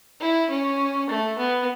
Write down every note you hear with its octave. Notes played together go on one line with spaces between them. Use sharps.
E4
C#4
A3
B3